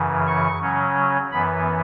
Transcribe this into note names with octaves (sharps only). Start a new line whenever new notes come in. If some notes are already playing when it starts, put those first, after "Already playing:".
Already playing: F#2 C#3 E3
C#6
C#3 F#3 C#4
F#2 E3 B3 B5